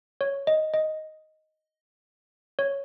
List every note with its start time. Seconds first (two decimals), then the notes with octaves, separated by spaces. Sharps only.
0.21 C#5
0.47 D#5
0.74 D#5
2.59 C#5